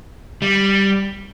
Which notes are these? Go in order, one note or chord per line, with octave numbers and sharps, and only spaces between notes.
G3